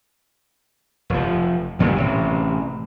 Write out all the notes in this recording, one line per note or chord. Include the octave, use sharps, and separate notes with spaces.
F1 F3
D2 A#2 F#3 G3
A1 C3